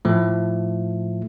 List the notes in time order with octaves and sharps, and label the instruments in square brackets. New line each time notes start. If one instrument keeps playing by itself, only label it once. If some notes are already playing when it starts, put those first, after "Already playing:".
[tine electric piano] A2 F3 A3